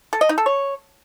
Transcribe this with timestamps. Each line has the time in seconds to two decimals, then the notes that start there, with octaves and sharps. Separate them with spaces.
0.13 A4
0.21 D#5
0.29 D#4
0.38 A4
0.46 C#5